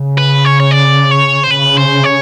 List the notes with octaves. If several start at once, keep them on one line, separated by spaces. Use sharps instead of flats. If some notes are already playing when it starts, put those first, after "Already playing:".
Already playing: C#3
B4
C#5
C#5
D5
C#5
C5
C#3 B4
C5
C#5